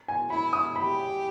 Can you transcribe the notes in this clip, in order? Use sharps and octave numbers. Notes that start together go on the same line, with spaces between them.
G#5
E4 B5
D#6
G4 B5